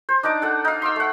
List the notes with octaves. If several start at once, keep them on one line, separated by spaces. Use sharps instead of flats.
C5
D4 D#4 A#5 D6
A4 F#5 A5
D#4 F5
C6 D6 E6
A3 F#5